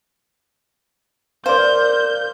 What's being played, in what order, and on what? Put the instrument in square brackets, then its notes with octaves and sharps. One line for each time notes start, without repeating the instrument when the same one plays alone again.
[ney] A#4 [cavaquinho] C5 [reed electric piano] D5 F5 [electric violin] G6